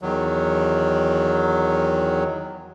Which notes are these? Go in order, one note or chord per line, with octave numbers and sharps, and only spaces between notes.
E2 D#3 F#3